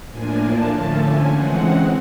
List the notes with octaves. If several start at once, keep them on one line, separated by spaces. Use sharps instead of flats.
A2 F3 A#3 D4 G#5
A5
D3 F3 A3 C#4 A5
G#5
C#3 E3 G#3 C4 F#5